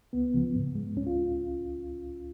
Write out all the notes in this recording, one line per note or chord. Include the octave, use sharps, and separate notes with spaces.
C#2 B3
C#3 F3
G#2
G#3
C#2 C#4
F4